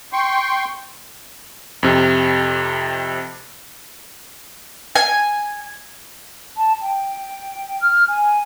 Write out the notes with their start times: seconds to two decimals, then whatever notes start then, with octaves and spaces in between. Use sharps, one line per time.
0.13 G5 C6 C#6
1.83 F2 C3
4.96 G#5
6.57 A5
6.81 G5
7.81 F6
8.09 G#5